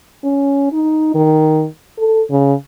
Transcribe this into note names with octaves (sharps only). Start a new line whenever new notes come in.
C#4
D#4
D#3
A4
C#3